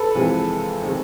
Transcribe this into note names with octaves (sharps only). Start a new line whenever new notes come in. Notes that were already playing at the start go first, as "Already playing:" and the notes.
Already playing: A4 B4
F2 C3 E3 G#3 C4
D#3 G#3 C4 D#4